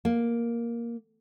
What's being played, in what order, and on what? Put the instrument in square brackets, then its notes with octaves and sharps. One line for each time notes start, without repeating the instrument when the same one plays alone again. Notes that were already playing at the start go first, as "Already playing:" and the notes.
[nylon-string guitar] A#3